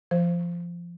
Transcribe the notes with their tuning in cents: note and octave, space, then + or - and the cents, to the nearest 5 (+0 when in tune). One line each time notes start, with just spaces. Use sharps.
F3 -15 C5 +0